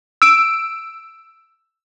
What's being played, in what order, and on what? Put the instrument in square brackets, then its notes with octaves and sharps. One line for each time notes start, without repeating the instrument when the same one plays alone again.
[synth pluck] E6 D7